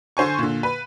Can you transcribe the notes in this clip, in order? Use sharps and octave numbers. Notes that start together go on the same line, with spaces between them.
D3 C5 G#5 C#6
A#2 D3
B4